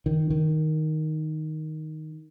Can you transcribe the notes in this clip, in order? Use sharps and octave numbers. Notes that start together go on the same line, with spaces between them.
D#3
D#3